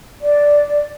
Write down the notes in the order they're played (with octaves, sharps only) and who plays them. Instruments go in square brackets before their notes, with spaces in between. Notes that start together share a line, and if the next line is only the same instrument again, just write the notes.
[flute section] D5